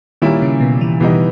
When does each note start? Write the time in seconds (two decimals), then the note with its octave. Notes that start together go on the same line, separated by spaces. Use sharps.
0.22 A#2 D#3 G3 A#3 C#4 E4
0.42 C#3
0.61 B2
0.81 E3
1.00 B2 E3 G3 B3 D#4